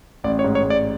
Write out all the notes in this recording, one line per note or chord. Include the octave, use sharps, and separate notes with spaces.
A1 D5
C#5
G#2
C#5
G#2
D5